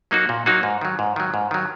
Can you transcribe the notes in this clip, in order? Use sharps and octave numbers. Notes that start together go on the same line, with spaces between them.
F#3 A#3 D#4 F#4
A#2
F#3 A#3 D#4 F#4
G#2
D#3 F#3
G#2
D#3 F#3
G#2
D#3 F#3